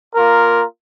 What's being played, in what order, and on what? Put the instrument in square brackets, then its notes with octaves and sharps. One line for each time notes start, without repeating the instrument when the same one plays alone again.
[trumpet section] A#3 F4 A#4